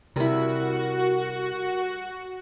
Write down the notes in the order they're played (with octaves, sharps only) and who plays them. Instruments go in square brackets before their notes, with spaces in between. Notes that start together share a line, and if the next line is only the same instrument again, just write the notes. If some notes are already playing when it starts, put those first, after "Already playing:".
[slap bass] C3 [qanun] G3 E4 [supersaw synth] F#4 [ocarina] A#4